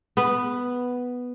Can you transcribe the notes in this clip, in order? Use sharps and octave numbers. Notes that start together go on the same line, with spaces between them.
B3 B4